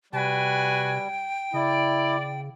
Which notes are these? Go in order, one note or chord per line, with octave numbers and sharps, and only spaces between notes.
C3 G3 F#4 B4 G5 G#5
C#3 E4 D5